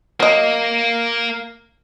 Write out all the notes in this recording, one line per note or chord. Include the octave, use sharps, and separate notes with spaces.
F#3 A#3 D#5